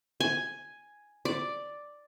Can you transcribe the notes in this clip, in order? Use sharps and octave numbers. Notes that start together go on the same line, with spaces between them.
G#5
D5